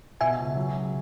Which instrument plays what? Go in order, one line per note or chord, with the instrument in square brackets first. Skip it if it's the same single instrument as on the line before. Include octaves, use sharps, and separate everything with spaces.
[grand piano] B2 [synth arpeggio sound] E5 G#5
[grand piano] C#2
F#3
C#3